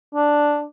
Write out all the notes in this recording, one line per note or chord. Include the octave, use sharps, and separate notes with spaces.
D4